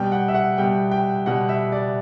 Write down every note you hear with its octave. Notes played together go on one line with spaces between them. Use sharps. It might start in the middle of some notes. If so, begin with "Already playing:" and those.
Already playing: B2 G3 G5
F#5
E5
F#5
B2 G3 G5
G5
B2 G3 F#5
E5
D5